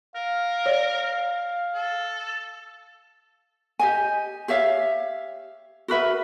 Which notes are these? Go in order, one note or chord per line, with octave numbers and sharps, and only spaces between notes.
A#4 F5
C#5 D5
A4
G4 D#5 G#5
G4 C#5 E5 F5
F#4 A#4 B4 E5